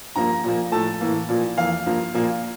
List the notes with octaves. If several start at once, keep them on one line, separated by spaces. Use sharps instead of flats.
G2 F3 A#3 A#5
A#2 F3 A#3
A2 F3 A3 A5
A2 E3 A#3
A#2 F3 A#3
F2 E3 A#3 F5
G2 F3 A#3
A#2 F3 A#3